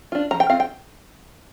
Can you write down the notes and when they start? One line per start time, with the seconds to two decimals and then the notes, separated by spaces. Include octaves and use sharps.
0.12 D4 F4
0.31 F3 A#5
0.40 G5
0.50 C4 F4 F5
0.60 G5